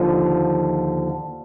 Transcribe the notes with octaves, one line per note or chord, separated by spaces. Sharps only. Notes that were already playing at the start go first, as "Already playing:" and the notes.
Already playing: D#2 D3 F3